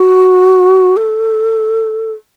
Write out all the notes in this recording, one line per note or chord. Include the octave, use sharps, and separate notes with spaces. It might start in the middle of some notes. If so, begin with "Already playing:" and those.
Already playing: F#4
A4